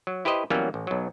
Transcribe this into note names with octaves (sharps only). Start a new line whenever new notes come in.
F#3
E4 G4 B4 C5 D#5
E3 F#3 G3 A#3 B3 C#4
A1
B1 F#3